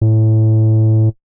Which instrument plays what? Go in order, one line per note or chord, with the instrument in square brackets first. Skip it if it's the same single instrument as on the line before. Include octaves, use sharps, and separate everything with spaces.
[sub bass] A2